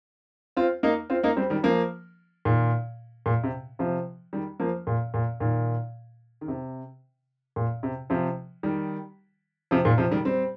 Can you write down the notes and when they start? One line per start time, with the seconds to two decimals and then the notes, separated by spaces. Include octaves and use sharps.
0.57 C4 F4
0.83 A#3 D#4
1.10 C4 F4
1.23 A#3 D#4
1.37 G3 C4
1.50 D#3 G3
1.63 F3 A#3
2.45 A#2 D#3
3.26 A#2
3.43 C3
3.79 C3 F3
4.33 D#3 G3
4.60 F3 A#3
4.87 A#2
5.14 A#2
5.40 A#2 D#3
6.41 D#3
6.48 C3
7.56 A#2
7.83 C3
8.10 C3 F3
8.63 D#3 G3
9.71 C3 F3
9.85 A#2 D#3
9.98 C3 F3
10.11 D#3 G3
10.25 G3 C4